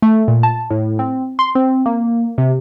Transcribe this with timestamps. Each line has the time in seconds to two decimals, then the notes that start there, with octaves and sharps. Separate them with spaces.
0.02 A3
0.28 A#2
0.43 A5
0.71 A2
0.99 C4
1.39 C6
1.55 C4
1.86 A#3
2.38 C3